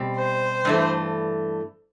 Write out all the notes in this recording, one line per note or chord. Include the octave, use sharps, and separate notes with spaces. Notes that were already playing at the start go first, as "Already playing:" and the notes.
Already playing: B2 G3 C4 G4
C5
G2 E3 A3